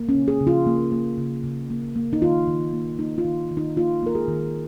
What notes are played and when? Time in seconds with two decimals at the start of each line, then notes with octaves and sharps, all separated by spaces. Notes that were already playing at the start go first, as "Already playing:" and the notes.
Already playing: A#3
0.09 C#4
0.15 C#3
0.28 G#4
0.40 C#3
0.47 F4
0.67 A#3
0.92 A#3
1.18 C#3
1.44 C#3
1.70 A#3
1.96 A#3
2.13 D#4
2.22 D#3 F4
2.48 D#3
2.73 A#3
2.99 A#3 D#4
3.18 F4
3.25 D#3
3.51 D#3
3.57 D#4
3.77 A#3 F4
4.03 A#3 A#4
4.15 G#4
4.28 D#3